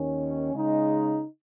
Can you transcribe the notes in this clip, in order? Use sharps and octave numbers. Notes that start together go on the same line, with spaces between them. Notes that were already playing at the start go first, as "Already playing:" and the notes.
Already playing: D#2 D#3 C#4
C#3 G#3 D#4